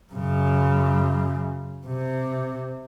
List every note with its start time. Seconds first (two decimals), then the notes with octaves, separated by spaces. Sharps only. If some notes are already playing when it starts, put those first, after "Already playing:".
0.13 F#2 C#3
1.86 C3